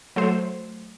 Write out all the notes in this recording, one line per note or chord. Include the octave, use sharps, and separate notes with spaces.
F#3 A3 C5